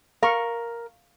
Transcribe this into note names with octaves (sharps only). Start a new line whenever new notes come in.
A#4 F5 C#6